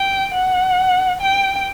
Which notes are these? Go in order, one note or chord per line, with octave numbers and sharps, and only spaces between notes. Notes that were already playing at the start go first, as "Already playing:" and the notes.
Already playing: G5
F#5
G5